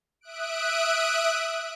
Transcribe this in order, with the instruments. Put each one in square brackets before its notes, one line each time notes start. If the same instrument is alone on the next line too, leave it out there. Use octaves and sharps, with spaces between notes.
[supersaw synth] E5 D#6 F#6 D7